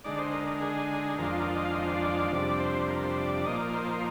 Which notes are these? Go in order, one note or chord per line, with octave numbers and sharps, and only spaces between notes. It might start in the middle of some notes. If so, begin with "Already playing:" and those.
D3 G#3 D#4 D5
C5
A#4
A#4
G#4
F2 D#3 G#3 D4 F4 A#4
D#5
F5
D#5
C5
D5
F2 C3 G3 D4
C5
A#4
C5
D5
A#2 F3 A#3 D#4 D#5
D5
D5
C5